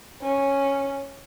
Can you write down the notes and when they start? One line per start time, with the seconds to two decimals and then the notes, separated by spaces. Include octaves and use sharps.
0.22 C#4